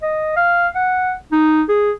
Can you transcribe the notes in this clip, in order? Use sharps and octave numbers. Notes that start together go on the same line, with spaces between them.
D#5
F5
F#5
D#4
G#4